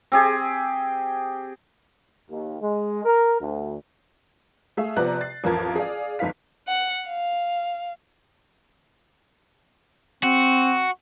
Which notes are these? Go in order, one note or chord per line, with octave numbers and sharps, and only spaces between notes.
C4 G4 G#4
D#2
G#3
A#4
D2
A3 G#4 E5 F5
C3 F3 B3 D5 A#5 F#6
A6 C7
A1 F2 F4 A#4 A5 G#6
G#4 D5 F5
G1 F2 D#4 B4 F5 B6
F#5
F5
C4 F#4